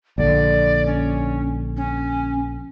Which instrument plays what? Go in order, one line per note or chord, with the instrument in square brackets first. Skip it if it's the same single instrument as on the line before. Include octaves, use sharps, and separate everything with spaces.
[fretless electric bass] A#1 D3 [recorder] D5
[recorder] C#4
C#4